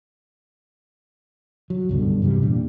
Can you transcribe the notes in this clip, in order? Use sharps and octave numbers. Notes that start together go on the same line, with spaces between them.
F#3
C#2 G2 B2 D3
G2 C3 E3 G3
E2 A#2 D4